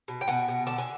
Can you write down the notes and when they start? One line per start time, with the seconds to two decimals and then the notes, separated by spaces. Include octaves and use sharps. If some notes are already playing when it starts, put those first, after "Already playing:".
0.08 B2
0.21 G5
0.28 B2 F#5 G#5
0.48 B2
0.67 D3 A5
0.78 G#5